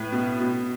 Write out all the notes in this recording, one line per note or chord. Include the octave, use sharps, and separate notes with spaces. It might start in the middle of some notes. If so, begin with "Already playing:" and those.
Already playing: A2 B4
B2
B2